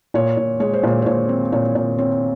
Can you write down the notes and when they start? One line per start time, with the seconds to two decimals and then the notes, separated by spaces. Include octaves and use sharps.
0.14 A#2 C#5
0.37 A#2
0.60 G#3 C#5
0.73 C5
0.83 A#2 C#5
1.02 C5
1.06 A#2 C#5
1.29 C4
1.52 A#2 C#5
1.75 A#2
1.98 C4 C#5